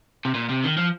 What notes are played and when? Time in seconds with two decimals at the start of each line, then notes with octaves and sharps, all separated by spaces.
0.25 C3
0.35 A#2
0.49 C3
0.64 D#3
0.77 F3